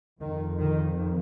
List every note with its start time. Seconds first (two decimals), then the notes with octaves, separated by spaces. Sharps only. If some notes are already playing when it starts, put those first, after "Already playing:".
0.21 F2 D#3
0.59 D#3